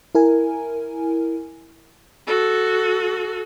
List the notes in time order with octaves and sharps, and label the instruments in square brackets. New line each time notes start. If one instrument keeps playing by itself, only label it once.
[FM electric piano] E4 A#4 G#5
[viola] F#4 A4